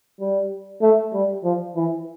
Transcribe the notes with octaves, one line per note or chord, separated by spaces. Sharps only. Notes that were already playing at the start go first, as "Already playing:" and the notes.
G3
A3
G3
F3
E3